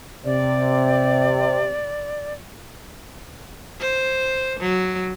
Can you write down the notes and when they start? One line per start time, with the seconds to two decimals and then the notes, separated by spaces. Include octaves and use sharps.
0.25 C3 D5
3.80 C5
4.60 F#3